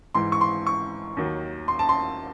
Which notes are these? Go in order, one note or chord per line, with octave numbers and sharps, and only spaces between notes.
G#2 E3 C6
C#6
C6
C#6
D#2 D#3 F#3
C6
A5
C6